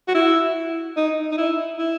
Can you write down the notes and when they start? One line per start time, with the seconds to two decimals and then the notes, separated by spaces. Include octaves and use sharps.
0.08 F#4
0.15 E4
0.97 D#4
1.32 D#4
1.38 E4
1.79 E4